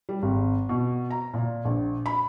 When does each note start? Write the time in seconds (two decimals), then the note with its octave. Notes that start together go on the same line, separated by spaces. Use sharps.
0.09 G3
0.22 G#1
0.69 B2
1.11 A#5
1.34 A#2
1.65 A#1
2.06 B5